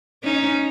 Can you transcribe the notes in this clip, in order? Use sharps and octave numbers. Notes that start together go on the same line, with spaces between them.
C#4 D#4